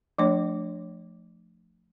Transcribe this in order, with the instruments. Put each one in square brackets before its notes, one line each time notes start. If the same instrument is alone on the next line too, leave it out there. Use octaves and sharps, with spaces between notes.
[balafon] F3 A3 D4 C#5